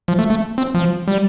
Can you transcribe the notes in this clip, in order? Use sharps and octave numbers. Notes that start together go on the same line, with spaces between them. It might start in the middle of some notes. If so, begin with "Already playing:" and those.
F3
A3
A3
C4
F3
G3